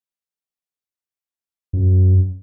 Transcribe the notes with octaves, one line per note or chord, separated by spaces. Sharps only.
F#2